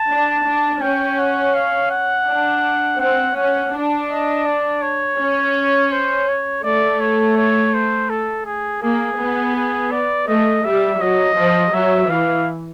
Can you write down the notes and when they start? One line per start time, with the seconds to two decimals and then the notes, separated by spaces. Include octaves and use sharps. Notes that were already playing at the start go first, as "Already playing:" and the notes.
Already playing: A5
0.09 D4
0.46 D4
0.81 C#4 G5
1.18 F#5
1.54 F5
1.91 F#5
2.27 D4
2.99 C4 F#5
3.36 C#4 F#5
3.73 D4
4.10 D#5
4.46 D5
4.82 C#5
5.18 C#4
5.92 C5
6.28 C#5
6.63 A3 D5
7.00 C#5
7.37 C#5
7.74 C5
8.09 A4
8.46 G#4
8.82 A#3 G#4
9.18 B3
9.55 G#4
9.91 D5
10.28 A3 D#5
10.64 G3 E5
11.01 F#3 D#5
11.37 F3
11.73 F#3 E5
12.09 E3 F5